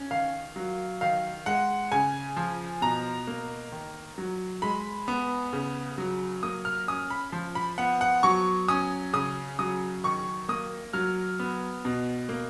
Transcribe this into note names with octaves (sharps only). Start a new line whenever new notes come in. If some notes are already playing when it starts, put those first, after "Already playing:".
Already playing: C#4
D#3 F5
F#3
D#3 F5
G#3 F#5
C#3 G#5
F3
B2 A#5
A#3
D#3
F#3
G#3 B5
B3
C#3
F#3
A#3 D#6
F6
C#4 D#6
B5
F3
B5
B3 F#5
F#5
F#3 C#6
C#4 D#6
C#3 D#6
F#3 D#6
D#3 C#6
A#3 D#6
F#3 F6
B3
B2
A#3